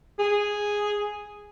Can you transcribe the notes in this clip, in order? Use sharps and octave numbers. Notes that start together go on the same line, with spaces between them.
G#4